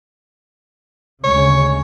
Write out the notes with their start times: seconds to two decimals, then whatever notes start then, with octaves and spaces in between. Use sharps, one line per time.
1.24 D2 C#3 G#3 C#5